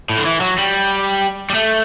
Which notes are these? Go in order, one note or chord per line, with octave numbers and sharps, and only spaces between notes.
A2
D3
E3
F#3
G3
G3
A3